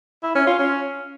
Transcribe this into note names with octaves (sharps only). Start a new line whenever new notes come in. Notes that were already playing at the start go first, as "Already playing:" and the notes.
E4
C#4
F4
C#4